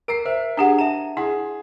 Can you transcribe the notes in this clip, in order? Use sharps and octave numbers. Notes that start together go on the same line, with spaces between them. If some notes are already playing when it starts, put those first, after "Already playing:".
A#4 A#5 E6 C7 D7
C5 E5
D4 G4 G#4 F#5
E5 A5 A#5 E7
E4 G#4 F#5